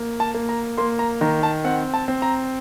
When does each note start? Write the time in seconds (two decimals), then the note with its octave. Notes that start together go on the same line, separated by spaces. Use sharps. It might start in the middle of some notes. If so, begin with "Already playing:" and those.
Already playing: A#3
0.20 A5
0.34 A#3
0.49 A#5
0.78 A#3 C6
0.99 A#5
1.21 D#3 A#5
1.43 A5
1.65 C4 F#5
1.94 A5
2.08 C4
2.22 A#5